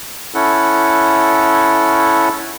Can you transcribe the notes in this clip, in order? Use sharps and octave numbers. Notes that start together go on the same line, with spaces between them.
C#4 E4 A4 F#5